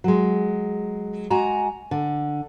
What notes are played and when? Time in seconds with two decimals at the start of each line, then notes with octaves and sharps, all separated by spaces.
0.04 F#3 G#3
1.30 G#3 F#4 G#5 A#5
1.91 D3